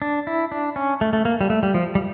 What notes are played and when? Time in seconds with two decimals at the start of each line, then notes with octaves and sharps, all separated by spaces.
0.02 D4
0.27 E4
0.52 D4
0.76 C#4
1.01 A3
1.13 A3
1.25 A#3
1.41 G3
1.50 A3
1.63 G3
1.74 F3
1.95 G3